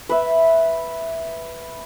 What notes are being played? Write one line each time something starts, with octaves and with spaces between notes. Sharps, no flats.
B4 E5